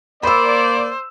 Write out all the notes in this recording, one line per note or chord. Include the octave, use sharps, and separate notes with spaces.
A#3 C5 D5 B5 E6